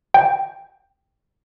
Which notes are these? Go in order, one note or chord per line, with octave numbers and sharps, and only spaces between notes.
G5